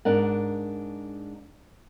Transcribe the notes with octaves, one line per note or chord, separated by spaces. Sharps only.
G#2 D4 A#4 F#5